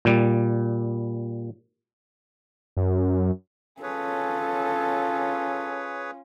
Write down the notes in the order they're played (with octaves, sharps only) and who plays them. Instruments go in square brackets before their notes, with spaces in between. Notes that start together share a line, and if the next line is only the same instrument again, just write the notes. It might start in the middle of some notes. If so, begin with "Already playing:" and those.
[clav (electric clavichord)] A#2 G3
[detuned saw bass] F#2
[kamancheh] C#4 F4 [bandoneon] G#4 B4 C#5 [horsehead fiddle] A4